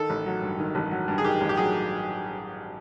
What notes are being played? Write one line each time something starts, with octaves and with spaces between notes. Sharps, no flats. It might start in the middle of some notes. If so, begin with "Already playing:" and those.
Already playing: D#3 A4
A1
F#3
G2
D#3
A1
F#3
G2
G#4
D#3 G4
A1
G4
F#3 G#4